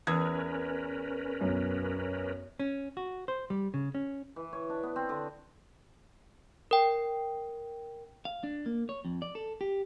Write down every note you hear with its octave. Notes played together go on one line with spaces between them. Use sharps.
E2 C#4 A#4 B4 G#6
B1 F#2
C#4
F#4
C5
G3
C#3
C#4
E3
C#5
D4
B3
C4
D3
A#4 G5
F5
D4
A#3
C#5
F2
D5
A4
G4